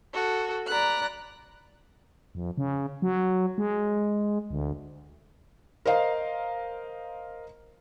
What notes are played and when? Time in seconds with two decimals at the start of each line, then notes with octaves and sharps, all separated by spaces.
0.14 F#4 A4
0.68 D5 A#5 B5 F#6
2.35 F2
2.58 C#3
3.02 F#3
3.58 G#3
4.51 D2
5.85 A#4 C5 D#5 F5 A#5